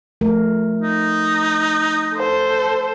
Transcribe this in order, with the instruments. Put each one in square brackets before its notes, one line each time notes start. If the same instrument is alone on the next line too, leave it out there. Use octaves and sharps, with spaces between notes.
[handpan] F3 A3 A#4
[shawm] D#4
[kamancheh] A4 C5